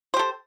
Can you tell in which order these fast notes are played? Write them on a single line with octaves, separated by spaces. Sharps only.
C5 G4 A4